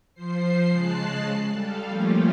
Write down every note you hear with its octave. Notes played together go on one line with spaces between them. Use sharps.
F3 C5 C7
C#3 G#3 A5 F#6 C7
G3 A4 F5
F3 G3 A3 A#3 C#4 F4